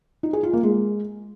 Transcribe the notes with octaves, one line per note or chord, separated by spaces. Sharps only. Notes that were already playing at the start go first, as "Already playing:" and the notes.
D#4
G#4
F4
A#3
G#3